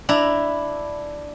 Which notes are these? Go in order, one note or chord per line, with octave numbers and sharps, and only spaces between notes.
D4 E4 A#5